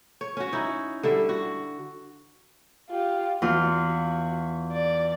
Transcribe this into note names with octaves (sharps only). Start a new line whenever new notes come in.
C#5
C#4 F#4
D#4 E4
D3 G3 E5
F#4
F4 G4
E2 F4 F#4
D5